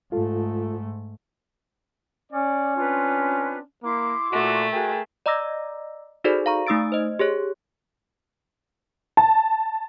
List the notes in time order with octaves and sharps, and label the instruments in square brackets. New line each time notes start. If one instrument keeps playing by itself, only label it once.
[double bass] G#2 A3 [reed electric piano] F4 A4
[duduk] C#4 [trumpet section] D5
[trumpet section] C4 D4 [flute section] F4 B4
[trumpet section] A#3 [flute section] E4 C6 D6
[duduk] A#2 [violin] A3 [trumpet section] F#4
[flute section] F#4 [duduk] G#4 [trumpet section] A#4 G5
[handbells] D5 D#5 A#5 D6 E6 A#6
D#4 F#4 G#4 A4 C5 D5
F5 A#5 C#6
A3 D#4 D#6 E6 A6 D7
C5 D#5
G4 G#4 C#5
[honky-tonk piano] A5